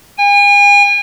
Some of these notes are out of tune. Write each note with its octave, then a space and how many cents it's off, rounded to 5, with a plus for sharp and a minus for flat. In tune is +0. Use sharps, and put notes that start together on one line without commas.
G#5 -40